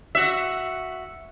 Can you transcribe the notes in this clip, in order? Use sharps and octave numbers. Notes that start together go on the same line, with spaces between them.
F#4 E5